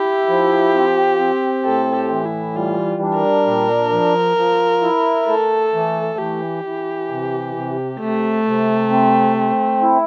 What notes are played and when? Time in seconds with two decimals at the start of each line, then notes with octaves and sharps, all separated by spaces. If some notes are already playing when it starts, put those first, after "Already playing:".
Already playing: E4 G4
0.29 F3
0.74 C4
1.19 C4
1.64 A2 A4
1.95 G4
2.11 E3
2.26 E4
2.56 G3 F4
3.02 D4
3.16 A#4
3.46 A#2
3.92 F3
4.37 F3
4.82 E4
5.28 A3 A4
5.74 E3
6.18 E3 G4
6.64 E3
7.10 C3
7.55 C3
8.00 C3 A3
8.47 C3
8.91 C4
9.37 C4
9.82 E4